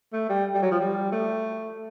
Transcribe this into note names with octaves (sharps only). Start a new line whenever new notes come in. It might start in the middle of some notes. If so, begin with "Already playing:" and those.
A3
G3
G3
F#3
F3
G3
A3